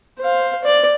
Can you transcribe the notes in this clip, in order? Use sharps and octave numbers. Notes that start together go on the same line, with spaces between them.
C5 F5
D5